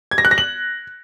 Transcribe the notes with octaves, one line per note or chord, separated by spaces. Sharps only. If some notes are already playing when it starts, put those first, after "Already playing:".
G#6
A#6
F#6
A#6
F#7